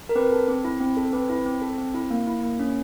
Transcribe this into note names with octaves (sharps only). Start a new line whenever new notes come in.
A#4
C4 B4
A4
C4
E4
C4
A4
C4 B4
E4
C4
A4
C4
E4
A#3
E4
A#3
C#4